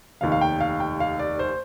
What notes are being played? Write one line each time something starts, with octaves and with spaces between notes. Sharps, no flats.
F1 D#2 D#3 F5
F5
G5
F5
G5
F5
D5
C5